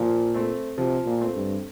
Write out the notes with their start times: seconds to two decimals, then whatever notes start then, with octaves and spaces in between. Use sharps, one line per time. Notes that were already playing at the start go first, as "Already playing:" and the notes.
Already playing: A#2 F3
0.34 A3 C4
0.78 C3 F3
1.06 A#2
1.21 A3 C4
1.35 G2